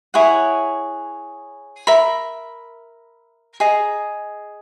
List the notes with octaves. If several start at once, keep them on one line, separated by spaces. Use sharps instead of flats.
E4 G#4 C#5 F#5
A#4 E5 B5
G#4 D#5 A#5